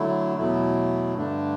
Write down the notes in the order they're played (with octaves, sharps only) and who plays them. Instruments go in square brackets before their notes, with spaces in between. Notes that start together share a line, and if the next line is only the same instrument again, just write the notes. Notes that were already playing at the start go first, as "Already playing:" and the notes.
Already playing: [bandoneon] D3 F#3 A3 E4
E2 B2 F#3 A3 E4
G2 D3 A3 D4